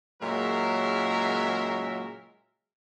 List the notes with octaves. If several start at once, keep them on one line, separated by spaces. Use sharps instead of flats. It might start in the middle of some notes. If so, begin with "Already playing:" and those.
A#2 C#3 F#3 G#3 A#4 E5